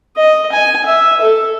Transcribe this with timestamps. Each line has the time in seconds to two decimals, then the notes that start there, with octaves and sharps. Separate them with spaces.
0.17 D#5
0.52 G#5
0.86 E5
1.21 A4